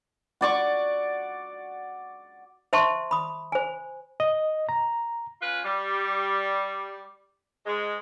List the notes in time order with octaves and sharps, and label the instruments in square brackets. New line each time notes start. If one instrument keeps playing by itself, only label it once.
[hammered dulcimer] F#4 D5 C#6
[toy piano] C5 E5 A5 C6 C#6
B5 D#6
C5 G#5
[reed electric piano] D#5
A#5
[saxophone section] C#4 F4 B4
G3
G#2 G#3